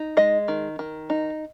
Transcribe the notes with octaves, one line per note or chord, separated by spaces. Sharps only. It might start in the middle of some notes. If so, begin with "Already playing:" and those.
Already playing: D#4
G#3 D#5
D#3
D#3
D#4